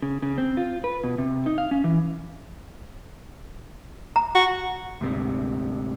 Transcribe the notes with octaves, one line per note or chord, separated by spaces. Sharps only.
C#3
C#3
C4
F4
B4
B2
C3
D#4
F5
C#4
E3
A#5
F#4
D2 G#2 C3